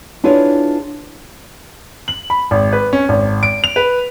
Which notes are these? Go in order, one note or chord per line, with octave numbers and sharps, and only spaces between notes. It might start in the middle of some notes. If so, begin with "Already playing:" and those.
D4 E4 F4 G#4 B4 C#5
F#7
B5
G#1
B4
C#4
G#1
D7
F7
B4